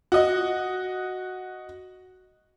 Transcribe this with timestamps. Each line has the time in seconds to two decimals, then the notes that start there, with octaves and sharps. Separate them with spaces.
0.12 F#4 D#5